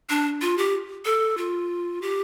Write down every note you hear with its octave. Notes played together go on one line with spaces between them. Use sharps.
D4
F4
G4
A4
F4
G4